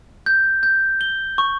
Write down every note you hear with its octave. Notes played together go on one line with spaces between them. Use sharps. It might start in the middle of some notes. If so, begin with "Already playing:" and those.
G6
G6
G7
C#6